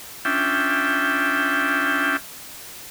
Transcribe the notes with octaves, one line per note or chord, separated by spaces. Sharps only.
C#4 D4 F4 E5 G5